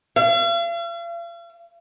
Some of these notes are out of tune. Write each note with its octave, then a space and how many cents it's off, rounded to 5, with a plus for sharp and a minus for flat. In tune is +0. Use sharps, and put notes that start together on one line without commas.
F5 -45